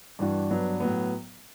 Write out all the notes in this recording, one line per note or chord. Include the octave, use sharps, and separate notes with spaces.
G2 E3 G3 D4 F#4
G2 F#3 B3 D4
A2 F#3 B3